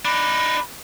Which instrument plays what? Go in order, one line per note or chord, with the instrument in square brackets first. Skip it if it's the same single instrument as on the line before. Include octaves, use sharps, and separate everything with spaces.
[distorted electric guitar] D4 D#4 [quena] B5